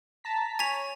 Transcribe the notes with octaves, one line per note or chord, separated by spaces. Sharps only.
A5 A#5 B6
C#5 G#5 B6 F7